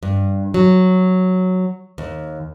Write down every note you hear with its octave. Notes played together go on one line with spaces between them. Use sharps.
G2
F#3
D#2